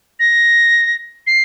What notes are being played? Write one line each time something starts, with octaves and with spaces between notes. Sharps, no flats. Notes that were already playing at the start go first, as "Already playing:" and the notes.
A#6
C7